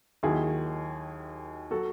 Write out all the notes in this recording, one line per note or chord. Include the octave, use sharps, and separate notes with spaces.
D#2 D#3 F#3 E4 G#4
F#3 F#4 A4